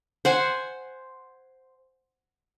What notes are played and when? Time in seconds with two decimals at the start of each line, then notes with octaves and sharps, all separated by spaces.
0.25 C5 F#5 G#5